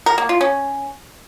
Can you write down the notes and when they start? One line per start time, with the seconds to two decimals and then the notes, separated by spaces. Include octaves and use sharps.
0.06 A#4
0.18 A#3
0.29 F4
0.41 C#4